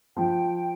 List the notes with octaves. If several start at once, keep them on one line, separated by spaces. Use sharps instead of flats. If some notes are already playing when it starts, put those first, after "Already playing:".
F3 G5